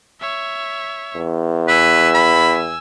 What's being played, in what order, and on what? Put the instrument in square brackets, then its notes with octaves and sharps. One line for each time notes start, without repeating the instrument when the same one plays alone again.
[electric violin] C#5 E5
[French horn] E2
[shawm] B4 [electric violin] G#5 E6
[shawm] B5